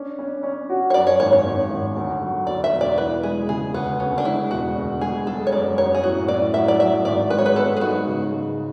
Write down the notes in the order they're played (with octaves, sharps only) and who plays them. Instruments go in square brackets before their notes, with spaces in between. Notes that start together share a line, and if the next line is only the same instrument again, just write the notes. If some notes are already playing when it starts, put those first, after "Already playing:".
Already playing: [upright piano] C#4 D4
C#4
C#4
F#4
[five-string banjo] C#5
[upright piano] F#2 [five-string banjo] D5
[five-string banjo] C#5
[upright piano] G#1 [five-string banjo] C#5
[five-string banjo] C#5
[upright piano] G#1
G#1
D2
F#3
[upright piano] D2 [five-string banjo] D5
[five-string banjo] E5
[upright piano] E1
[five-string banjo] D5
[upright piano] E3 [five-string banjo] B4
[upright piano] G#3 [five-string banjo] G#4
[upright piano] C#3 [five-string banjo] G#4
[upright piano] D2 [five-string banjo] B3
[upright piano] D2 [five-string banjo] C#4
[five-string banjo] D4
[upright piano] G#3 [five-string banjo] E4
[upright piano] E1 [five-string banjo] F#4
[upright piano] D2
[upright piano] G#3 [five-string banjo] G#4
[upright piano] G#3 [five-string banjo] A4
[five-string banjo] C#5
[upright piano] F#2 [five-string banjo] D5
[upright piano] F#2 [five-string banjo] C#5
[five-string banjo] G#4
[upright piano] A2 [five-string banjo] F#4
[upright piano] A2 [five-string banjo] D5
[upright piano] F#3 [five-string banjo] E5
[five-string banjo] D5
[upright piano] F#3 [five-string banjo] E5
[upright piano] G#1 [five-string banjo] D5
[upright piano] G#3 [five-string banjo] B4
[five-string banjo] C#5
B4
[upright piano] B3 [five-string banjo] A4
[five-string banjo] G#4
[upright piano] G#2 [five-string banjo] F#4
[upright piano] C#3
G#3